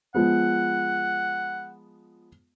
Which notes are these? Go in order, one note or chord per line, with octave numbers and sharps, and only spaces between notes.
F3 G#3 B3 F#5